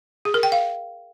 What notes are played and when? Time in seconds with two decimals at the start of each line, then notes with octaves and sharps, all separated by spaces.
0.25 G#4
0.34 A#4
0.43 G5
0.52 F5